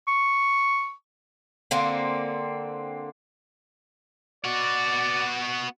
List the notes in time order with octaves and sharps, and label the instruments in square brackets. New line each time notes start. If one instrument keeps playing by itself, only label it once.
[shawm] C#6
[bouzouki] D3 A#3 C4
[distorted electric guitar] B3 F#4 [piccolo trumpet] D5